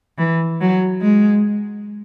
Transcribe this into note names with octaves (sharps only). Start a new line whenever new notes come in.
E3
F#3
G#3